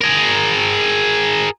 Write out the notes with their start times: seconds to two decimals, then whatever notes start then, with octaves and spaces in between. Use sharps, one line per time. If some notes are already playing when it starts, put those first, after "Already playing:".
0.01 G#4 A#4